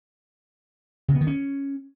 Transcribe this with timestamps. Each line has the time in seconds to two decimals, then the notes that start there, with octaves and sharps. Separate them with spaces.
1.08 C#3
1.15 B3
1.21 D#3
1.27 C#4